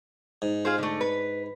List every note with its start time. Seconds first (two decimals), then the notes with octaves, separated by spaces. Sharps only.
0.42 G#2
0.65 F4 G#4 C5
0.78 D3 A3
1.01 B4